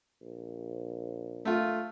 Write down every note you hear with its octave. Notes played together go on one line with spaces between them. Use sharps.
A#1
A3 F4